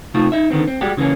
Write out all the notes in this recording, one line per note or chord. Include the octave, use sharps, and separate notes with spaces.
C3 A3 C4 D#4 F4
D#4 E5
D3 D#3 B3 C4
C4
G3 G#3 F#4 G4
C#3 E3 A3 A#3 C#4